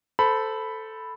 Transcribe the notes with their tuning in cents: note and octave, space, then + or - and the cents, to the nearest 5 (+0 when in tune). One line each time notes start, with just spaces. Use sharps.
A4 +0 C5 -20 B5 +0